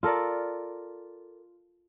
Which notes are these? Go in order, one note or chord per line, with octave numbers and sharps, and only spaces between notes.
F4 A4 A#4 D5